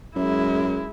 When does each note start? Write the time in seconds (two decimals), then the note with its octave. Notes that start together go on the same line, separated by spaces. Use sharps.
0.16 F#2 G#3 E4